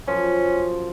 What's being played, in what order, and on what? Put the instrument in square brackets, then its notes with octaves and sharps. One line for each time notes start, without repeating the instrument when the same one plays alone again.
[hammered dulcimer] F#2 F3 [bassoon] C#4